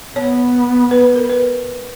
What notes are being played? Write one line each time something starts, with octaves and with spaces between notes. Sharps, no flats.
B3 C#5
B4
B4
A#4
B4